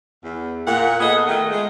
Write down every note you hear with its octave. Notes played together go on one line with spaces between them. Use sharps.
E2
A#2 A#3 F#5
B3 G#4 A4 D#5
D#3 A3
G#3